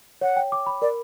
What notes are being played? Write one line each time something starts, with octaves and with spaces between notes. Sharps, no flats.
C#5 F#5
G5
D6
B5
A#4 D5